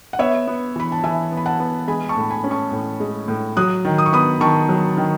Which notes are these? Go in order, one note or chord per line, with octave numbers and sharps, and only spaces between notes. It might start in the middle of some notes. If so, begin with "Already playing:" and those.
F#5
B3 C#5 E5
B3
E3 B5
A5
E3 E5 G#5
B3
B5
F#5 A5
B3
G#3 G#5 B5
A5 C#6
A2
G#5 B5
C#4
A5 C#6
A2
G#3
A2
F#3 D#6 F#6
D#3
D#6
C#6
B3 B5 D#6
D#3 A5 C#6
F#3
D#3